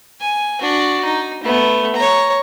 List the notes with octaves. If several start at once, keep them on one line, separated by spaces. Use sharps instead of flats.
G#5
D4 F#4
D#4
A3 B3
C#5 A#5